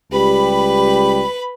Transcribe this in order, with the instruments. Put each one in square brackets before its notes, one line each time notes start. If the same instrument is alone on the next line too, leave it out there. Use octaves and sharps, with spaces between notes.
[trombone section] C#2 G3 G4 [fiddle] B4 B5